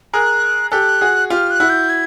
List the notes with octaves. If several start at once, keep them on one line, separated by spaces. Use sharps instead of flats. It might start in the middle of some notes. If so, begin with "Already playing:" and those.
G#4 A#4 F#6
G4 A4 F#6
F#4 G#4
F4 G4 F6
F#6
E4 F#4
G6
G#6